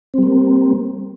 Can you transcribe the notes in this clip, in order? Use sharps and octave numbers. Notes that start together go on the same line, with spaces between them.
G3 A#3 C4